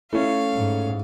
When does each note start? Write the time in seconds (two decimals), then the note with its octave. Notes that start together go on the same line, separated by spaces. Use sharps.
0.13 A3 C#4 E4 F5
0.55 G#2